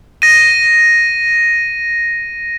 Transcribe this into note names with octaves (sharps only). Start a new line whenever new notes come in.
A#6 D#7